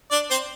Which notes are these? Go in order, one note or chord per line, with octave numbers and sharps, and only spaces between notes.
D4 D5
C4 C5